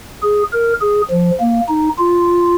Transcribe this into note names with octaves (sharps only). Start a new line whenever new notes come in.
G#4
A#4
G#4
F3
A#3
D#4
F4